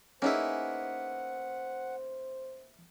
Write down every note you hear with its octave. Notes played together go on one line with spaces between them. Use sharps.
A#3 B3 C#4 D#4 E4 G#4 C5 F#5